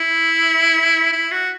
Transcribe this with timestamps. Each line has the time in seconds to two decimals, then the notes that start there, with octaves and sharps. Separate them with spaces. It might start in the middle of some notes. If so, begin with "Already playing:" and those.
Already playing: E4
1.13 E4
1.32 F#4